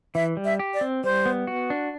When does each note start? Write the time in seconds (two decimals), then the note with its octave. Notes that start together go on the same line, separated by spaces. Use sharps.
0.15 E3 E5
0.37 G3
0.45 E5
0.59 G4
0.74 D5
0.81 C4
1.04 G3 C5
1.26 B3
1.47 F#4
1.70 D4